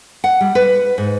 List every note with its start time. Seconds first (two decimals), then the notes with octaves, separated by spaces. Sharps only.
0.24 F#5
0.41 G3
0.55 B4
0.98 G#2